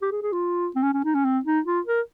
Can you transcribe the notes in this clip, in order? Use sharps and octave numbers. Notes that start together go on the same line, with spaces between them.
G4
G#4
G#4
F4
C4
C#4
C#4
D#4
C#4
C4
D#4
F4
A#4